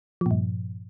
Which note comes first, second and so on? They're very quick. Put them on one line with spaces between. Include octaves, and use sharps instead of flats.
F3 A#2 G2